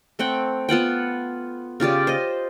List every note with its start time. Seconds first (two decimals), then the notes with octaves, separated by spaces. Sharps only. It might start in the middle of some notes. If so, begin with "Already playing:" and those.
0.19 A3 C4 F#5 G5
0.69 B3 F4 F#5 G5
1.80 C#3 F4 G4 D5
2.07 C5 D#5